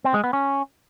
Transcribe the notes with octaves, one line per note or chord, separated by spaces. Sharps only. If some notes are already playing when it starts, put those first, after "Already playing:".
C4
G#3
B3
C#4